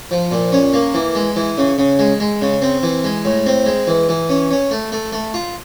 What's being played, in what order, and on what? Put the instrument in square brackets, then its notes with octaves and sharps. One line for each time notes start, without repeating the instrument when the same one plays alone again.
[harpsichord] F3
A#2
C#4
A#3
E3
G#3
E3
C#3
C#3
G#3
G#3
C#3
C4
E3
G#3
A2
C4
G#3
E3
E3
C#4
C#4
A3
A3
A3
F4